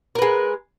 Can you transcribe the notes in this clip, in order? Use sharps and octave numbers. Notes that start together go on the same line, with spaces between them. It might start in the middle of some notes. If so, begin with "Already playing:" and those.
G#3 A#4 B4